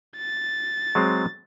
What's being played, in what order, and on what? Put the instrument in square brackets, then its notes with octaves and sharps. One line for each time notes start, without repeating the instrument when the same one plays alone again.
[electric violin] A6
[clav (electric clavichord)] F#3 G#3 C4